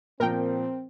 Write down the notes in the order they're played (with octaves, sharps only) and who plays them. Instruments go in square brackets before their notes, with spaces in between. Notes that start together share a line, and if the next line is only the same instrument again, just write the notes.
[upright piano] A#2 F3 [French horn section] C4 [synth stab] A#4 G5